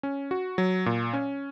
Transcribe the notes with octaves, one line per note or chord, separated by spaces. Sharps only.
C#4
F#4
F#3
A#2
C#4